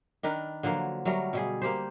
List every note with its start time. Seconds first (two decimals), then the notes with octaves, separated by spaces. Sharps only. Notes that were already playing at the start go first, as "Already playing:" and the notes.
0.23 D#3 D4 A#4 B4
0.63 D3 F3 F#3 A#3
1.05 F#3 G3 A3 A#4
1.33 B2 G3 G#4
1.62 A#3 G4 C5